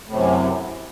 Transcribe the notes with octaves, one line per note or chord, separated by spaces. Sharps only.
F#2 A2 C3